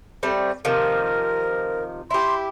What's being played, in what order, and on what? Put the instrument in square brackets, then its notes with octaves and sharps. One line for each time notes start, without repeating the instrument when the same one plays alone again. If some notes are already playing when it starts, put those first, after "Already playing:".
[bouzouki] G3 A3 C4
[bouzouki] C3 D#3 F3 [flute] A#4
[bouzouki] E4 G4 [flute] C6